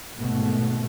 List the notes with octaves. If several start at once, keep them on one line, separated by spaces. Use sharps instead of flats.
G#1 B2 A3